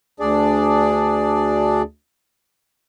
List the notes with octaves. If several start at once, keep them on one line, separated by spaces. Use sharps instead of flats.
D2 D4 G#4 D5